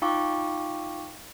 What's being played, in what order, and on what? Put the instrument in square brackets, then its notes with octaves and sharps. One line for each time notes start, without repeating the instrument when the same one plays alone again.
[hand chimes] D#4 F4 F5 G5 C#6 D6